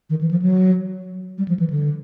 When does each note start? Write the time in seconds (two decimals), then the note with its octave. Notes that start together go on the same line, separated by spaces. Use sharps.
0.10 D#3
0.21 E3
0.31 F3
0.42 F#3
1.38 G3
1.48 F3
1.59 E3
1.70 D3